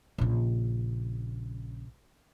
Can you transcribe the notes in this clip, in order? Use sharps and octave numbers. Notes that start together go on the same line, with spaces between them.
A#1 C#3